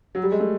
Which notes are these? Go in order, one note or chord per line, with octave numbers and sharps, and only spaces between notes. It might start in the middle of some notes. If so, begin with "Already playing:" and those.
F#3
G3
G#3
A3